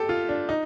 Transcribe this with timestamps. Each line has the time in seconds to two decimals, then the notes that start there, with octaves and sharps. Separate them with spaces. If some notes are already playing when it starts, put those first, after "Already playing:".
Already playing: G4 A4
0.09 F4
0.29 D4
0.49 D#4